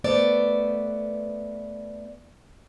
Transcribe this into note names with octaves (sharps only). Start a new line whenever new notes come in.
A3 B3 C5 D5